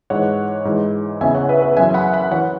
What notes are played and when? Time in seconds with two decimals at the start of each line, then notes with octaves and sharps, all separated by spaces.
0.10 G#2 E3 C#5 F#5
0.65 G#2 E3
1.21 E2 C#3 E3 E5 G#5
1.34 C#5 F#5
1.49 B4 E5
1.62 B4 E5
1.77 F#2 E3 E5 G#5
1.94 F#5 B5
2.13 F#5 B5
2.31 E3 C#5 F#5